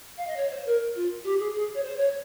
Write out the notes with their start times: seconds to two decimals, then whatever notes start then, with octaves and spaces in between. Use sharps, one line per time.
0.17 F5
0.27 D#5
0.36 C#5
0.51 C5
0.66 A#4
0.95 F4
1.24 G4
1.38 G#4
1.54 G#4
1.74 C#5
1.82 C5
1.97 C#5